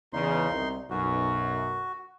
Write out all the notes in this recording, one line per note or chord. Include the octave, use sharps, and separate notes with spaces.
E2 C#3 D#4 C6
C2
B1 F#2 F#4